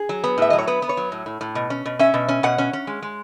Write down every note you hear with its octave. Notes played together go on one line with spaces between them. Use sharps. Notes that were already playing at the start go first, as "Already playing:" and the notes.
Already playing: G#4
F#3
B3
A2 E5
F#3 D#5
C#5
B3 B4
B3
C#5
F#3
A2
A2
A2
B2
C#4
B2
C#4 E5
B2
C#4
B2 F#5
C#4
C#4
G#3
G#3